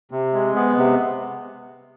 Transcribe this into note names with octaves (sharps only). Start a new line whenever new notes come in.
C3
G#3
B3
C3